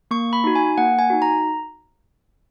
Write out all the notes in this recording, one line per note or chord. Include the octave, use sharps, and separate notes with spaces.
A#3 C#6
B5
D#4 F#4
G#5
A#3 F#5
G#5
D#4 F#4
A#5